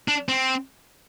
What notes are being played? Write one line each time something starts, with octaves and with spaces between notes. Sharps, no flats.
D4
C4